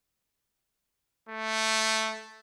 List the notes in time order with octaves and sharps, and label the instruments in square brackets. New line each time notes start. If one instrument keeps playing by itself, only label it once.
[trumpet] A3